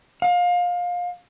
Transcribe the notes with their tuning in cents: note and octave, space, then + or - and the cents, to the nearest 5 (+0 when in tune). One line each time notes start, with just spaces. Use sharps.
F5 +25